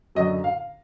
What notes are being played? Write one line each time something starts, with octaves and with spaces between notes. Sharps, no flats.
F#2 D3 F#3 D#5
F5